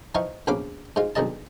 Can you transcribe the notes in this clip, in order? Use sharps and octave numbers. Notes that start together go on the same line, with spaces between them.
E3 F3 D#4 F5 F#5 C#6
A#1 E2 C#4 B4 F5 D6
G#2 G#3 F4 F5
B1 G2 D#3 G#3 D#5 A5